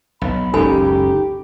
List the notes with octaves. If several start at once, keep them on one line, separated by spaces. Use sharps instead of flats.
B1 B5
F#1 C#2 C#4 D#4 G4 A4 G#5 B5